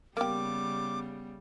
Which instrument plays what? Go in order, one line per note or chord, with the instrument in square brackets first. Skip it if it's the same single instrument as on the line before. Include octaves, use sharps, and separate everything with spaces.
[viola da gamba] C#3 G3 [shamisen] A#3 G4 [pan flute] B3 [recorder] D6